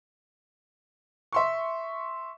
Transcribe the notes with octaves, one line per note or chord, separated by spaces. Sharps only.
E5 C6 C#6